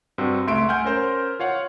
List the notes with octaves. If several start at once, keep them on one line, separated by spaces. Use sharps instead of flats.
G2 C4 F#4 C6 E6
C#2 A3 E5 C6 C#6 D7
F#5 G#5 F6 G6
C#4 A#4 C5
F4 C#5 F5 F#5